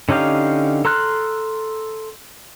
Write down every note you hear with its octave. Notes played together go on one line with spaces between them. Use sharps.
D3 C#4 D#4 G4 F5
A4 A#5 C6 F6 F#6